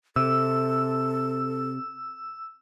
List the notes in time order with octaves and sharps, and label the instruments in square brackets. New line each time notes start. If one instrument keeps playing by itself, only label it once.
[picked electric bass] C3 [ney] A4 [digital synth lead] E6